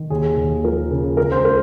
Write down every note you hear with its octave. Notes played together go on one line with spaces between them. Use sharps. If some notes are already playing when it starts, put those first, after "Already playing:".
Already playing: D#3
D#2 G#4
D#2
F3 A#4
C#3
C#2 A#4
C5
A#4